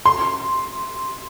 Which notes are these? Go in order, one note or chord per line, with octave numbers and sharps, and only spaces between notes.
C6